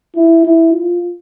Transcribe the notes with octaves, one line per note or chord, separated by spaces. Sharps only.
E4
E4
F4